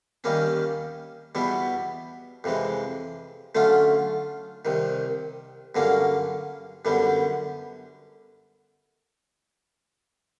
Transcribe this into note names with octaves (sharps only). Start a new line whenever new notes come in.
D#2 D#3 G3 A#3 C#4
E2 B2 G3 B3 E4
F2 C3 E3 G#3
D3 F#3 A3 C#4 F4
C2 C3 D#3
G2 D3 F#3 A#3 C#4
F#2 D3 G3 B3